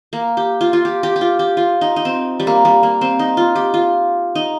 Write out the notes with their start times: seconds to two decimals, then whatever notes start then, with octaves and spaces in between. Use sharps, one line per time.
0.13 A#3
0.37 G4
0.61 F4
0.73 F4
0.85 G4
1.03 G4
1.16 G4
1.21 F4
1.39 G4
1.57 F4
1.81 D#4
1.96 D#4
2.05 C4
2.40 G3
2.47 A#3
2.65 G3
2.83 A#3
3.01 C4
3.19 D#4
3.37 F4
3.55 G4
3.74 F4
4.35 D#4